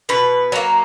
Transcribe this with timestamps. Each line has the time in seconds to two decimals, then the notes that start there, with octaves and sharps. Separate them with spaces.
0.09 B2 B4
0.52 F#3 A#3